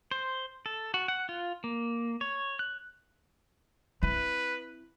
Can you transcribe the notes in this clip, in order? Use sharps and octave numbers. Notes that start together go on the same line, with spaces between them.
C5
A4
F#4
F#5
F4
A#3
C#5
F#6
C4 E4 B4